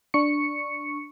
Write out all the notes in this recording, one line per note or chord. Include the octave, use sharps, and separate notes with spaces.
D4 C#6 C#7